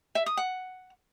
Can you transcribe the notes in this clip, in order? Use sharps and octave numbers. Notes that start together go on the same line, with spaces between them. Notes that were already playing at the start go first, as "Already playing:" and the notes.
E5
D#6
F#5